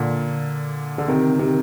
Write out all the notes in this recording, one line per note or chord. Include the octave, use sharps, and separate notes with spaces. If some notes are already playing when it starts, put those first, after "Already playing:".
Already playing: A#2 D3
D3
C3 D#3
C3 D#3